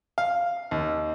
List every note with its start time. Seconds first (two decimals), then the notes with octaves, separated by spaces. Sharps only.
0.18 F5
0.71 D#2